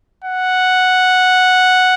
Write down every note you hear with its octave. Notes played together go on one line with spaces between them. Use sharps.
F#5